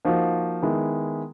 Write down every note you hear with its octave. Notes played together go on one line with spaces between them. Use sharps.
F3 A#3 D#4 F#4
D#3 G#3 B3 E4